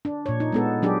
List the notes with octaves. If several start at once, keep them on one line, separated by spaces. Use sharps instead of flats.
D4
A#2 C#5
D#4
G#3 B3 A4
F#3 D4 G4 G#4